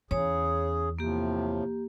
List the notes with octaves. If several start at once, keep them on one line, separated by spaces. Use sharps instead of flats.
E2 C#3 G#4 C#5
A2 C3 F3 A#3 G4